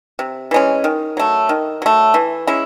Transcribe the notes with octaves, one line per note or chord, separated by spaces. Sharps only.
C3
E3 G#3 C#4
D#3
F#3 A3
D#3
F#3 A3
E3
G#3 C#4 E4